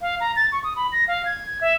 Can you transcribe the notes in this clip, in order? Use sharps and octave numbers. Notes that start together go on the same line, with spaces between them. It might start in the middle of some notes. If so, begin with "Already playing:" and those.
F5
A#5
A6
C#6
D#6
B5
A#6
F5
G#6
E5